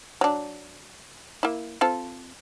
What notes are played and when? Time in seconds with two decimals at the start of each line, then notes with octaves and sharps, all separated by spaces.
0.21 F#3 D4
1.43 A#3 E4
1.81 C4 F4 A4